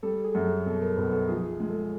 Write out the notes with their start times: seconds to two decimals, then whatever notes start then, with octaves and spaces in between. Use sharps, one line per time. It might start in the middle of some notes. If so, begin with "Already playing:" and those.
0.03 G3 A4
0.24 G#4
0.35 F#2 G#4
0.45 A4
0.66 B2 A4
0.81 A#4
0.97 B1 B4
1.12 A4
1.28 F3 G#4
1.49 G#4
1.60 G#3
1.70 A4